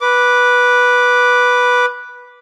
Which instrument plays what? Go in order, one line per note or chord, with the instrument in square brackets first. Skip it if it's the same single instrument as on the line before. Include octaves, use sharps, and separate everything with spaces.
[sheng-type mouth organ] B4 D6